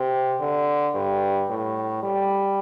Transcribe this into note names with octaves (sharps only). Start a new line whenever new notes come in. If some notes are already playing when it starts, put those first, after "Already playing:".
Already playing: C3
D3
G2
A2
G3